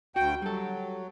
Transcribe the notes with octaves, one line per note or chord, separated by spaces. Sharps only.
D2 F#4 G5
F#3 G3 A4